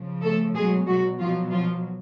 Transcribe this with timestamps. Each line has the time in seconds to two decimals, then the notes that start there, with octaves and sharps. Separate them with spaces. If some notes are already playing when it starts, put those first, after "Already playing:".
Already playing: C#3 F3
0.22 A3 A4
0.54 B2 F#3 G#3 G#4
0.87 F#3 F#4
1.19 B2 F3 F#3 F4
1.51 F3 F4